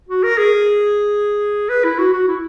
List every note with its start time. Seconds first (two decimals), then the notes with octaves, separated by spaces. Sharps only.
0.09 F#4
0.23 A#4
0.38 G#4
1.69 B4
1.84 E4
1.99 F#4
2.13 F#4
2.28 E4